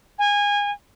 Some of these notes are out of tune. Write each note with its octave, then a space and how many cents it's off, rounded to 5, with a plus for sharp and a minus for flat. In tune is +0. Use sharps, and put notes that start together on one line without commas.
G#5 -25